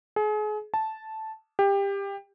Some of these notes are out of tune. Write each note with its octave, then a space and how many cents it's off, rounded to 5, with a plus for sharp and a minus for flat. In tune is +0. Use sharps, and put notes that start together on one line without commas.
G#4 +35
A5 -5
G4 +20